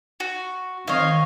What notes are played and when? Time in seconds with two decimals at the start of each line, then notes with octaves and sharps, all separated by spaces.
0.20 F#4
0.88 D#3 C4 C#5 D#5 F5